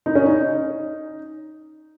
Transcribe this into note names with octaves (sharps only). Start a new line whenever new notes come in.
D#4
C#4
D#4